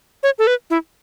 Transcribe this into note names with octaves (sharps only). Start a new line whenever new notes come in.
C#5
A4
B4
E4